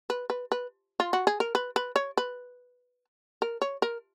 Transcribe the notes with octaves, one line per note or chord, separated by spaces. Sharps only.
B4
B4
B4
F4
F#4
G#4
A#4
B4
B4
C#5
B4
A#4
C#5
A#4